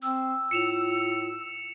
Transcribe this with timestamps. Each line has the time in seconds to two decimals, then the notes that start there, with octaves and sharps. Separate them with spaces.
0.02 C4 E6
0.51 A2 F4 C#7 E7 F7